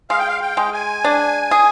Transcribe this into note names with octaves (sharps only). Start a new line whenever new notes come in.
G#3 F5
G5
F5
G5
G#3
G#5
D4
G#4